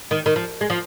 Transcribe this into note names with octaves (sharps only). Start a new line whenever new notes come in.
D#3
D#3
F3
G#3
F3